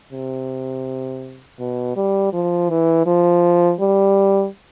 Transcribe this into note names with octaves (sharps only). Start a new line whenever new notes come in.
C3
B2
G3
F3
E3
F3
G3